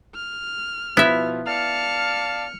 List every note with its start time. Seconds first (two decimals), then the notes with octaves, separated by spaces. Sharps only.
0.15 F6
0.97 B2 F3 B3 E4 E5
1.47 D5 F5 A5 F6 C#7